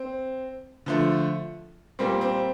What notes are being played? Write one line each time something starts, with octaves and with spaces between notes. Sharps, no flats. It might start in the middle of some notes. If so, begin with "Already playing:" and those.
Already playing: C4
D3 F3 A3
A#2 G3 A#3 C4
C4